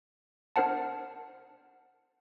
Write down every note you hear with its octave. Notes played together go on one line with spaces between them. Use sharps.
D4 A#4 C5 F#5 A5